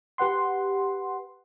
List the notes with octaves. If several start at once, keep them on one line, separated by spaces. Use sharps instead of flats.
G4 B4 F#5 C6